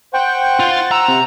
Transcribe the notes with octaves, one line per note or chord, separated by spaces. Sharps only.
C5 F#5 G5 C#6
F4
A6
A#5 E6
C3